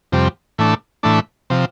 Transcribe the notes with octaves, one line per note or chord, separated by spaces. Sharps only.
F2 C3 G3
A2 E3 A3 D4
A2 E3 A3 D4
C3 F3